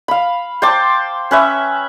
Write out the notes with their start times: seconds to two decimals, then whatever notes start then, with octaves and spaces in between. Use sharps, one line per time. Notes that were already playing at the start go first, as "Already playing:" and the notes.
0.08 F5 B5
0.62 C5 G5 A5 D6
1.31 C#4 B4 E5